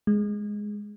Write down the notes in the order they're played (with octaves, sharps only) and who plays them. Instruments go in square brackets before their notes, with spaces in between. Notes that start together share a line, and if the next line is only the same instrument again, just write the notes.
[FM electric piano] G#3